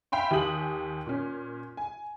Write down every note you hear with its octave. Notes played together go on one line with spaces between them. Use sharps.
E5 F5 G5 B5 C6
D#2 G4 G#5 D#6 F#7
A#2 C#4
G#5